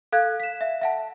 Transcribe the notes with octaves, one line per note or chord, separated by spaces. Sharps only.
A4 F5 F#6 G#6
B6 E7
E5
E5 F#5 A5